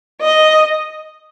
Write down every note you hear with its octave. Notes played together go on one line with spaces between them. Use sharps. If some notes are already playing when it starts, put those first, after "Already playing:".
D#5